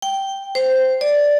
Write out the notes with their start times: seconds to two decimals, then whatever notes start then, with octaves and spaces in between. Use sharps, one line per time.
0.02 G5
0.55 C5
1.01 D5